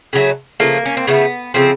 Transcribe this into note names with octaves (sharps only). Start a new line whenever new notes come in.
C#3 F#3 A3
C#3 F3 A3 A#3
C#4
C4
C#3 F3 A3 B3
C#3 F3 A3 C4